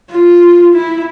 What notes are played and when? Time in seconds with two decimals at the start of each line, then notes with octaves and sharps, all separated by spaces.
0.10 F4
0.73 E4